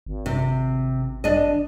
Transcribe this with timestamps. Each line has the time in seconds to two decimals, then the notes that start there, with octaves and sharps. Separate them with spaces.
0.06 G#1
0.26 C3
1.24 D4 D#5